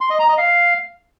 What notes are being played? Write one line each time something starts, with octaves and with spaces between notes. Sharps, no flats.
C6
D#5
A#5
D#5
F5